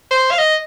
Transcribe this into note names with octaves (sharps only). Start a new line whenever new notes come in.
C5
F5
D#5